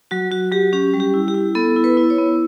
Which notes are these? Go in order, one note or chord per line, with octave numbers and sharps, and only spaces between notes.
F#3 F#4
F#3 F#4
F#3 G4
C#4 G4
G3
G4
E4
G4
E4
B3 A4
E4
B4
E4
C#5
B3